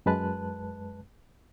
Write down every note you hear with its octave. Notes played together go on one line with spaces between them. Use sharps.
F#2 G#3 B4 A5 F#6